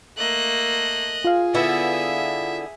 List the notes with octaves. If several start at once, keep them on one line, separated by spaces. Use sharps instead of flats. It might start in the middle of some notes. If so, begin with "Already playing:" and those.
A3 A#3 D#5 F#6
F4 G#4 F5
D3 B3 E4 E5